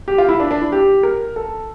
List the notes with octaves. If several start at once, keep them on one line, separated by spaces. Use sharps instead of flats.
G4
F4
E4
D4
D4
E4
G4
A#4
A4